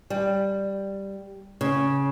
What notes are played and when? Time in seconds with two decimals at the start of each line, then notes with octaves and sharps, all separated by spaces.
0.10 G3
1.61 C#3